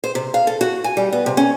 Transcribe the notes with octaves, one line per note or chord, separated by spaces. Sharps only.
C5
C3
F5
A4
F#4
G#5
G3
B3
C3
C#4